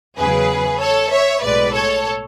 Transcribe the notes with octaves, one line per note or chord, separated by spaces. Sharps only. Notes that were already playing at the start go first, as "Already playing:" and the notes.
E2 C#3 F#3 G#4 B4
A4 C#5
C#5 E5
B1 A2 G#3 B4 D5
A4 C#5